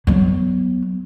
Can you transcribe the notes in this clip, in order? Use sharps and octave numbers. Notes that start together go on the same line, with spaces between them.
F#3 B3